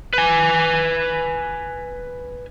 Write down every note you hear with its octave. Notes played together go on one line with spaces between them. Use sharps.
B4 G#5